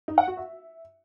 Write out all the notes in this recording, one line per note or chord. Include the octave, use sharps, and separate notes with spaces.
D#4
F#5
F#4
E5